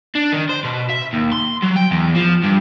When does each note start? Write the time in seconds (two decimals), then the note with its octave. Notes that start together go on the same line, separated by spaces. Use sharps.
0.15 D4
0.32 D#3
0.49 C5
0.64 B2
0.90 E5
1.13 D#2
1.32 C6
1.62 F#3
1.76 G5
1.91 E2
2.16 F3
2.44 G2